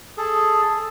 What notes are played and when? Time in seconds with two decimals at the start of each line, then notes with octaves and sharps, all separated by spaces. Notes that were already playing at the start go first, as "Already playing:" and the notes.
0.18 G#4 A4